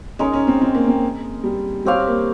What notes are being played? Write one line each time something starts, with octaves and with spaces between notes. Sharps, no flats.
G#3 C#4 D#4 A#4
C#4
C4
C4
A#3
C4
G3
G3 C4 G4 C#5 F5
A#3